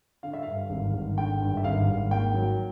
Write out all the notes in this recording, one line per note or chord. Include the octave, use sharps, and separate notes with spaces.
D3 F5
E5
G2 F5
G#1
G#1
D3 G5
G2
E5
G#1 F5
G#1
A#3 G5
F#3